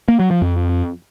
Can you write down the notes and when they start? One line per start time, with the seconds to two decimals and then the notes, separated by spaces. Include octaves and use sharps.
0.08 A#3
0.20 F#3
0.31 F3
0.42 F2